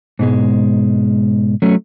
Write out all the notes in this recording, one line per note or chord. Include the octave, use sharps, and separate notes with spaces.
G#2 B2 G#3
F#3 A3 C#4